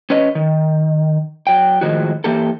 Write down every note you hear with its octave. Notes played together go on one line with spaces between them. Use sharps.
C#4 B4 C#5 D#5
D#3
F#3 G5
A2 D#3 F3 G#3 F#4
E3 A#3 G4 A4